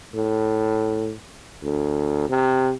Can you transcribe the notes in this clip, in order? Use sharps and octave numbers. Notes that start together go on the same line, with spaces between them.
A2
D2
C3